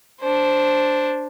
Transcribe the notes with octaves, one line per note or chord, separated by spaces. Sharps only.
D4 C5